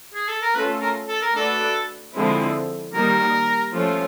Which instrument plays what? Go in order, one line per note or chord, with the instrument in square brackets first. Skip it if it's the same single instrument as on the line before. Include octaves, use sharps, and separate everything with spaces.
[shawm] G#4
A4
A#4
[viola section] A3 C#4 F4 A4 [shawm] B4
[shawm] A#4
A4
A#4
[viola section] A3 D4 F#4 B4 D5 [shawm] A4
[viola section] D3 F3 G#3 C4 E4
[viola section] D#3 G3 A#3 [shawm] A#4
[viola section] F3 A3 C#4 F4